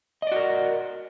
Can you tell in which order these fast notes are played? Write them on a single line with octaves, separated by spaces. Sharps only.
D#5 D5 F#4 A#4